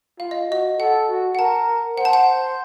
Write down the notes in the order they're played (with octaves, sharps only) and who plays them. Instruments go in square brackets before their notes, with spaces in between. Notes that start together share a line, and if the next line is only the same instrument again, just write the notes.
[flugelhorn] F4 [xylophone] F5
[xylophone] D#5
[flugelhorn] F#4 [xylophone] D#5
[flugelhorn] A4 [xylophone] F#5
[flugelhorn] F#4
[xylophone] F#5
[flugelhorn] A#4 [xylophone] A5
[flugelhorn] C5 [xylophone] F#5
[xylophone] A5
F#5